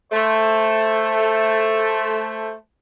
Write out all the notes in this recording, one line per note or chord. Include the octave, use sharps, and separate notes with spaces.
A3 C5